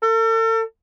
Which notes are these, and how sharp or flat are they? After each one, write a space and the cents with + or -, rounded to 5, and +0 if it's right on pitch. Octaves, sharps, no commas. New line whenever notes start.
A4 +40